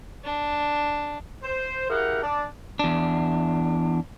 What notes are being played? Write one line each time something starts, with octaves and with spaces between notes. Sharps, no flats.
D4
C5
E4 G4 G#4 A#4 F5 F#5
D4 D5 A5
E2 D4